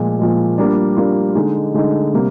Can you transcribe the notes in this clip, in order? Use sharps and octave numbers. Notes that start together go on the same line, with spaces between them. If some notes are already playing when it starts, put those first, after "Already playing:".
Already playing: A#2 F3 G#3
A#2 F3 G#3
G3 A#3 D4 F4
G3 A#3 D4 F4
D3 G#3 D#4
D3 G#3 D#4
C3 G3 A#3